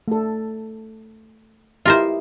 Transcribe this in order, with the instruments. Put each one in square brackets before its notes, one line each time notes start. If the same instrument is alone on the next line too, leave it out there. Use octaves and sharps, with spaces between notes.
[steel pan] A3 A4
[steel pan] E4 G4 D#5 [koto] F4 A#4 C5